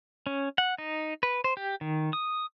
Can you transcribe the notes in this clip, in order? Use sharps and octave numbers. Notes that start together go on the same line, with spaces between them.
C#4
F#5
D#4
B4
C5
G4
D#3
D#6